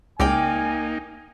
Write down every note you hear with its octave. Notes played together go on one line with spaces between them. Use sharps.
C#2 A#3 D#4 D5 F5 G5 G#5